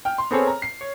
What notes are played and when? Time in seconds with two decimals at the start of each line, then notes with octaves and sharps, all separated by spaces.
0.05 G5 F6
0.18 C6
0.31 B3 C4 G#4 A4 C5 C#5
0.48 A#5
0.62 C7
0.81 C#5